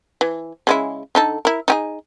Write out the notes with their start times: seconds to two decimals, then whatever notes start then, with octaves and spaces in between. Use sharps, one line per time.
0.21 E3
0.67 C#3 G#3 E4
1.15 D3 D#4 A4
1.45 E4 A#4
1.68 D#4 G4 G#4